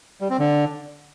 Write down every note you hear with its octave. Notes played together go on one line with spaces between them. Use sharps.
G3
C4
D3